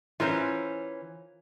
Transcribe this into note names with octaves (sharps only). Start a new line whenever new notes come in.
E3 C#4 F4 A#4 C5